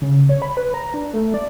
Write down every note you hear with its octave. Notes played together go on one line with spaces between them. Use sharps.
C#3
C#5
B5
B4
A#5
D4
A3
D5